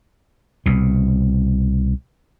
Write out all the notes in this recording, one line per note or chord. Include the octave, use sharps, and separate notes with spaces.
C2 B2